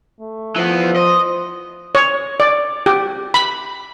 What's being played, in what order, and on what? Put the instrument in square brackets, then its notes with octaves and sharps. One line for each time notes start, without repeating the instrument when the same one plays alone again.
[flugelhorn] A3
[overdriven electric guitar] E3 B3 [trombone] F3
[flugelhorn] C5 [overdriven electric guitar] D#5
[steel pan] C#5
D5
G4
B5